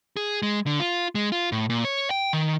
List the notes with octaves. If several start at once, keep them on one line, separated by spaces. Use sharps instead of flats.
G#4
G#3
D3
F4
G#3
F4
A2
A#2
C#5
G5
D#3